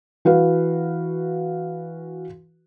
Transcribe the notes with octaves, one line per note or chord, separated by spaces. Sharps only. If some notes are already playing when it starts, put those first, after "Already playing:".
E3 F#4 B4 F5